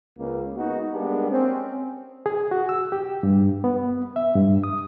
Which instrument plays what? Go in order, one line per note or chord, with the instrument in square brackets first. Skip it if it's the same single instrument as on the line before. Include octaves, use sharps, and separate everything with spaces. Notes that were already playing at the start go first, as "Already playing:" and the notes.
[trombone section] C#2 A#3 B3
G#3 B3 D#4 F#4
G3 G#3 A#3 B3 D4 G4
C4 C#4
[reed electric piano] G#4
F#4
E6
G4
G2
B3
E5
G2
D#6